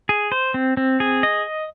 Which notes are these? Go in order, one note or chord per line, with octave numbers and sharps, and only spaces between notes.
G#4
C5
C4
C4
G#4
D#5